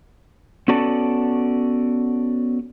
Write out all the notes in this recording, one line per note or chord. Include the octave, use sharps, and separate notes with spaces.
B3 C#4 F#4 A4 D5 A5